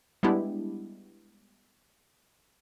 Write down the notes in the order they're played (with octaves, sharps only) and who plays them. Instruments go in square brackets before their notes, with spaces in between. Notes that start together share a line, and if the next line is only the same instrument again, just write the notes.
[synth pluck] G3 G#3 B3 D4 E4 G4